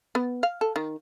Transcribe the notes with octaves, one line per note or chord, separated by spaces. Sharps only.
B3
F5
A4
D#3